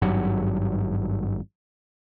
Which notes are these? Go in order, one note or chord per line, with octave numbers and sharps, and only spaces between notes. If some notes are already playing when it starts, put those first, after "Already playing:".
G#1 G2 F#3